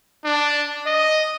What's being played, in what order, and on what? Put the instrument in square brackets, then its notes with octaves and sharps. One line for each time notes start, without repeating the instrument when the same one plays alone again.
[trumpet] D4
D#5